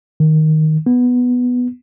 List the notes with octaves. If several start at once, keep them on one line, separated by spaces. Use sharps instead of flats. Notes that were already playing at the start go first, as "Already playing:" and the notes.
D#3
B3